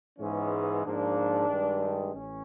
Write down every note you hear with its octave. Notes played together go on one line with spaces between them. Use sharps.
G#2 E3 G#3 B3 C#4
G#2 F3 A#3 D4
G2 D#3 G#3
A1 C#4